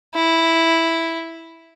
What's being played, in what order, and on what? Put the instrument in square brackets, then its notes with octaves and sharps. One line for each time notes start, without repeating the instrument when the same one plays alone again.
[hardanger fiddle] E4